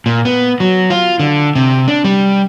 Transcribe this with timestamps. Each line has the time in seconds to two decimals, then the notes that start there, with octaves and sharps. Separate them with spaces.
0.06 A#2
0.25 B3
0.60 F#3
0.90 F4
1.19 D3
1.55 C3
1.88 D4
2.05 G3